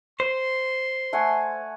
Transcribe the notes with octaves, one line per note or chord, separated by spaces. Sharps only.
C5 C6
A3 F#5 G#5